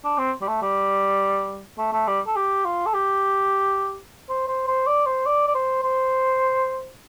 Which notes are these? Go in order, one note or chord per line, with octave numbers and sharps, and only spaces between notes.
D4
C4
G3
A3
G3
A3
A3
G3
A4
G4
F4
A4
G4
C5
C5
C5
D5
C5
D5
D5
C5
C5